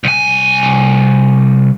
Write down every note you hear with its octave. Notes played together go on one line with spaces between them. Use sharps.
C2 G#5